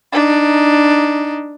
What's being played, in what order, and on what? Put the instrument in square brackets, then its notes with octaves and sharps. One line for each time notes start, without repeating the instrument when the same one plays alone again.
[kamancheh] D4 D#4